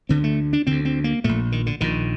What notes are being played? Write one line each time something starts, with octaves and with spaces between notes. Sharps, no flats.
D2 D3 C4
A3
D4
D2 D3 C4
C4
A#3
A#1 A#2 A3
D#3
D3
A#1 A#2 D#3